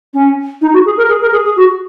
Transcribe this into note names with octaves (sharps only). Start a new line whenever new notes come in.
C#4
D#4
F#4
G#4
A#4
G#4
A#4
G#4
G#4
F#4